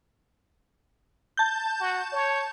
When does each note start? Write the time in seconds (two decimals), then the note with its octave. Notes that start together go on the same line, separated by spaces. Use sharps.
1.37 A5 G6
1.81 F#4
2.13 C#5